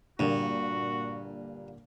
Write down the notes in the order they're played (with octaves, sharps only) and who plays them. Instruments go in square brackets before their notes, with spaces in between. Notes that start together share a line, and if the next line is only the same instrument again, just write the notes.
[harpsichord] G2 [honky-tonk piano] A#2 D3 A#3 [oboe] F#4